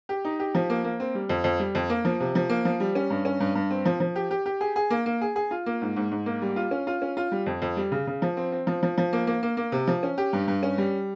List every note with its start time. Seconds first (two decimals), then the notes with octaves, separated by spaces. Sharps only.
0.09 G4
0.25 D#4
0.39 G4
0.55 F3
0.70 A#3
0.84 A#3
1.00 C4
1.15 G3
1.29 F2
1.44 F2
1.60 G3
1.75 F2
1.90 A#3
2.05 F3
2.20 C3
2.35 F3
2.49 A#3
2.65 F3
2.80 G3
2.95 C#4
3.10 G2
3.25 C#4
3.40 G2
3.55 G2
3.70 C4
3.85 F3
4.00 F3
4.16 G4
4.31 G4
4.46 G4
4.61 G#4
4.76 G#4
4.90 A#3
5.06 A#3
5.21 G#4
5.36 G#4
5.51 F4
5.66 A#3
5.81 G#2
5.96 G#2
6.11 G#2
6.26 A#3
6.42 G3
6.56 F4
6.71 C#4
6.87 F4
7.02 C#4
7.17 F4
7.32 G3
7.46 F2
7.62 F2
7.77 G3
7.92 C#3
8.07 C#3
8.22 F3
8.37 C4
8.52 C4
8.67 F3
8.83 F3
8.98 F3
9.13 A#3
9.27 A#3
9.43 A#3
9.57 A#3
9.72 C3
9.87 F3
10.03 C#4
10.18 G4
10.33 G2
10.48 G2
10.63 C#4
10.78 G3